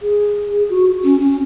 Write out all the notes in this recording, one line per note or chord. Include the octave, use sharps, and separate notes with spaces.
G#4
F#4
C#4
C#4